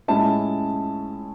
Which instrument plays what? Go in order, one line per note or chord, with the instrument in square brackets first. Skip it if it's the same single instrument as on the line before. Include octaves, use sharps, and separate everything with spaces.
[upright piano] A2 G#3 C#4 E4 A5